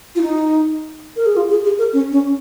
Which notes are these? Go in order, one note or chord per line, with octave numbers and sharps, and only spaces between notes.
F4
D#4
A#4
G#4
F4
G#4
G#4
A#4
C#4
C#4